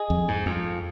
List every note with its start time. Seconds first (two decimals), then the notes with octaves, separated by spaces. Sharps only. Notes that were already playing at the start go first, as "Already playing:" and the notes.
Already playing: G#4 D#5
0.10 F2
0.28 G#2
0.46 F2